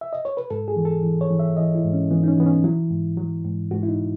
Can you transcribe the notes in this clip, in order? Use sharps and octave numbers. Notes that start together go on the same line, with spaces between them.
E5
D#5
C#5
B4
G#2 A4
G#4
E3
A4
E3
C#5
E3
E5
E3 D#5
E4
G#2
C#4
E3 B3
D#4
C#4
E3 B3
C#4
F#3 E4
G#2
F#3
G#2
G#2 F#4
E4
D#4